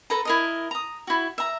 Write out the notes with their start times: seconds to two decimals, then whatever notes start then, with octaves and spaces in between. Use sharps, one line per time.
0.10 A4 B4 A5 A#5
0.25 E4 A#4 D#5
0.71 A#5 D#6
1.07 E4 F#4
1.38 E5 A#5